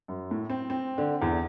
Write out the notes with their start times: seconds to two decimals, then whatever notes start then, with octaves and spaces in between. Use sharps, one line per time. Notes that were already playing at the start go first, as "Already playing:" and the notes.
0.08 F#2
0.31 A2
0.50 C4
0.70 C4
0.98 D3
1.22 E2